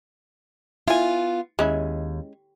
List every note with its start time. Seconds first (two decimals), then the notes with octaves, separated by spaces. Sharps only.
0.88 B3 E4 F4 G#5
1.59 D#2 G#3 C#4 E4